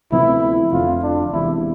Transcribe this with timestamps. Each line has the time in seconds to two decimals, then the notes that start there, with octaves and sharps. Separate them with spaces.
0.12 D2 C3 F3 B3 E4
0.72 F1 F2 D3 F4
1.03 D4
1.33 E1 E2 C3 E4